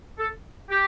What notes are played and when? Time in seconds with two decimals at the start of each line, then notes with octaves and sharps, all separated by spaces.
0.18 A4
0.70 G4